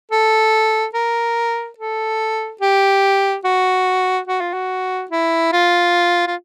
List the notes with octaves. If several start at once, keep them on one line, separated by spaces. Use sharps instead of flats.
A4
A#4
A4
G4
F#4
F#4
F4
F#4
E4
F4
F4